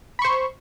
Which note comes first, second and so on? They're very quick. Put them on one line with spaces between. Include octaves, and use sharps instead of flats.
B5 C#6 C5